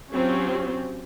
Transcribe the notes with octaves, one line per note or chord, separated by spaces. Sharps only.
F#3 C4 C#4 F4 G4